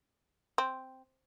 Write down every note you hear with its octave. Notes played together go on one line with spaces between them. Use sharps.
C4